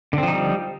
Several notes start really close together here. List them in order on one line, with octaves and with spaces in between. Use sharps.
D3 C4 F3 D#4 G3